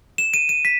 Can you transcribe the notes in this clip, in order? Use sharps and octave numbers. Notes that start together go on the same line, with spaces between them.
E7
D#7
D#7
B6